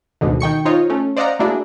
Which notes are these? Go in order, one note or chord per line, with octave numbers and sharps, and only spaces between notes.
D2 G#2 B2 D3 D#3
D#3 G5 C#6 C#7
D#4 F4 C5 C#5 D#5
A3 C#4
C5 D5 D#5 F5 F#5 A#5
A3 A#3 D4 E4 F#4 G#4